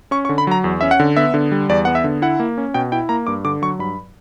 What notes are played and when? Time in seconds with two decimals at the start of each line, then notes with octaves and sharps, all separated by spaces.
0.11 C#4 C#6
0.25 C#6
0.29 D3
0.38 B5
0.47 F#3 A#5
0.64 E2
0.81 C#4 E5
0.91 F#5
1.00 D3
1.17 B3 E5
1.34 D3
1.52 G3
1.69 E2 D5
1.85 B3 F#5
1.95 E5
2.04 D3
2.22 E4 F#5
2.40 A#3
2.58 C#4
2.74 B2 G5
2.92 E4 G5
3.09 A#3 A#5
3.27 G2 D6
3.45 D3 D6
3.62 F#3 C#6
3.79 G2 B5